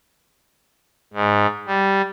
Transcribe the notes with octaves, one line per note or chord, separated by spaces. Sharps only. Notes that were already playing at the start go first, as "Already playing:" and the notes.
G#2
G3